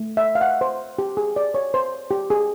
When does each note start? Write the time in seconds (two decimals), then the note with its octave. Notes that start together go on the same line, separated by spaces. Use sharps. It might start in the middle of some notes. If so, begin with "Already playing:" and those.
Already playing: A3
0.17 E5
0.35 F5
0.41 F#5
0.61 C5
0.99 G4
1.17 G#4
1.36 D5
1.54 C#5
1.74 C5
2.11 G4
2.30 G#4